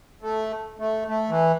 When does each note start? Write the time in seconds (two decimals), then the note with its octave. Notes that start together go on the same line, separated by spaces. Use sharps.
0.22 A3
0.79 A3
1.08 A3
1.30 E3